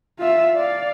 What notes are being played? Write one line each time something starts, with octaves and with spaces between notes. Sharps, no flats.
F4 E5
D5 F5